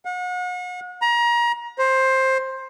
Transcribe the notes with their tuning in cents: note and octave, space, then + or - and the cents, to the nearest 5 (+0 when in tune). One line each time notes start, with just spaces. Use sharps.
F#5 -40
A#5 +30
C5 +15